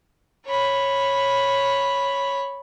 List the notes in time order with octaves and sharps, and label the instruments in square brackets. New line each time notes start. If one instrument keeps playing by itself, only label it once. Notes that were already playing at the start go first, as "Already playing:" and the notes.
[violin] C#5 B5